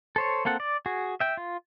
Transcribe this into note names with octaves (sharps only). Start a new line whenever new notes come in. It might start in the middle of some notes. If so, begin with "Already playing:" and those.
A4 C5 C#5
A#3 C4 A4 F#5
D5
F#4 G#4
E5 G5
F4